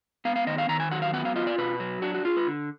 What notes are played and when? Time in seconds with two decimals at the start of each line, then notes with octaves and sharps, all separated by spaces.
0.25 B3 F5
0.36 F5
0.47 D#3 D#5
0.58 F5
0.69 D#3 A#5
0.80 G#5
0.91 F#3 F#5
1.02 F5
1.13 B3 F#5
1.25 F5
1.36 F4 D#5
1.47 D5
1.58 B2 B4
1.80 F#3
2.02 D4 F#4
2.15 F#4
2.25 F4 G#4
2.37 B4
2.47 D3